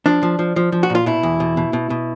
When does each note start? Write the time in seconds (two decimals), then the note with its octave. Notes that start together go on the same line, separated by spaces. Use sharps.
0.06 F3 D4
0.23 F3
0.39 F3
0.56 F3
0.72 F3
0.83 F#4
0.90 A#2 F4
1.06 B2 E4
1.23 E2
1.40 B2
1.57 B2
1.73 B2
1.90 B2